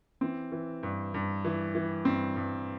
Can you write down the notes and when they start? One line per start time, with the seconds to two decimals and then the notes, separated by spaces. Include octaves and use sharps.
0.21 E3 C4
0.52 E3
0.83 G2
1.14 G2
1.45 E3
1.75 E3
2.05 G2 C4
2.36 G2